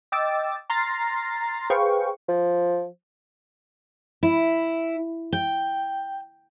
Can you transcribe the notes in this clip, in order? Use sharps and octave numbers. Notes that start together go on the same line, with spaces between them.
D#5 G5 D6 E6 A6
A#5 C6 F6 A6 A#6 C7
G#4 B4 C5 F5 G5 C#6
F3
E4
G5